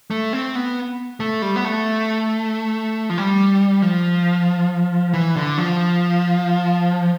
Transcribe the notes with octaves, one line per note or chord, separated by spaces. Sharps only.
A3
C4
B3
A3
G3
B3
A3
F3
G3
F3
E3
D3
F3